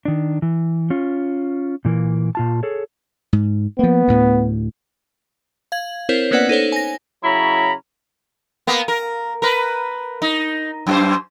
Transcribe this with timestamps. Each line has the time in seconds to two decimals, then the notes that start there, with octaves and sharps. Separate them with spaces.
0.05 D#3 D4
0.42 E3
0.90 C#4 F4
1.85 A#2 E3 A#3
2.35 A#2 F4 A5
2.63 G#4 A4 C#5
3.33 G#2
3.79 F3 A#3 B3
4.08 D2 A2
5.72 F5 G#6 F#7
6.09 C4 E4 A#4 C5 C#5
6.31 A#3 B3 C#4 B4 D5 F#5
6.49 D#4 A4 C5 C#5
6.72 G#5 A#6
7.24 C#3 F#3 C#4 E4 A#5 B5
8.67 A#3 B3
8.88 A#4
9.42 A#4 B4
10.22 D#4
10.87 F#2 F4 C5